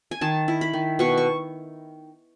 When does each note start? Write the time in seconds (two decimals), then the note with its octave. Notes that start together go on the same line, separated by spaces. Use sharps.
0.11 G#5
0.21 D#3 A5
0.48 E4
0.61 B5
0.74 D#3
0.99 B2 C#6
1.18 C#6